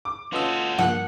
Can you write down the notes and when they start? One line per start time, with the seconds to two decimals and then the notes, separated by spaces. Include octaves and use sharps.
0.05 D6
0.33 C#4 F4 F#4 A4 B4 D#5 E6
0.78 G2 F3 A#3 F#5